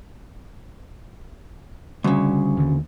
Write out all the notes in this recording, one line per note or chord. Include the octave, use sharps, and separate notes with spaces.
D2 C#3 G3
D#2 D3